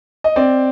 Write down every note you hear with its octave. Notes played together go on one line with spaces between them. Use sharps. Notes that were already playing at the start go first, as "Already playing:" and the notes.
D#5
C4 D5